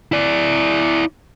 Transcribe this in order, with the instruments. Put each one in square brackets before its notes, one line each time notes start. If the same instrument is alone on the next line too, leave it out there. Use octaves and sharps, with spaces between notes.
[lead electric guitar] E4 D5